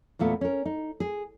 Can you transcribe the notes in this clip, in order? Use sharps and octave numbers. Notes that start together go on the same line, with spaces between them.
E2 A#2 A3 B3
C#4 A#4
D#4
G#4